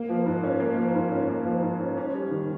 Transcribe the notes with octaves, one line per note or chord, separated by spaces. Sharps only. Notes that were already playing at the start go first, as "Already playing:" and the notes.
Already playing: A#3
F3
G#2
C#4
A#3
F3
G#2
C#4
A#3
F3
G#2
C#4
C#4
G3
D#3